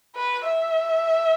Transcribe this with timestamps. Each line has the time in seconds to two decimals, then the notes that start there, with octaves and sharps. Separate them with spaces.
0.16 B4
0.46 E5